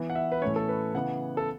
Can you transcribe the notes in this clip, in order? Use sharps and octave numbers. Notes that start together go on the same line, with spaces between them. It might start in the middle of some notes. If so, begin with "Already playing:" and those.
Already playing: E3 B3
F#5
E5
B4
A2 E3 A3 C#4 C#5
A4
B4
C#3 E3 B3 F#5
A4